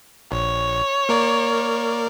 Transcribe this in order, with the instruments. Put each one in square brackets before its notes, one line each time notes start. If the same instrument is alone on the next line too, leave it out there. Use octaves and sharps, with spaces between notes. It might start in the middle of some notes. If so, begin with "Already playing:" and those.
[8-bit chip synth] A#1 [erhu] C#5
[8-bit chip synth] A#3 A#4 D5